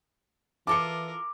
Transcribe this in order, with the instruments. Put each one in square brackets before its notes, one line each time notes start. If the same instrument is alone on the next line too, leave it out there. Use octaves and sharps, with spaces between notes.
[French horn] E3 [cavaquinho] F4 A4 A5 [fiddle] A#4 [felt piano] D6 C#7